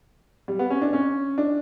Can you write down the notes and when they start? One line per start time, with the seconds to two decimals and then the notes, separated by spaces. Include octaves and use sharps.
0.48 G3
0.59 B3
0.70 C#4
0.82 D4
0.93 C#4
1.38 D4